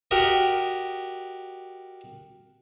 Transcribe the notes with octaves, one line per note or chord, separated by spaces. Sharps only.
F#4 G4 A#4 D#5